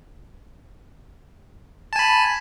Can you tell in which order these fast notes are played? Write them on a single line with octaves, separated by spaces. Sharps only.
A5 G#5 B5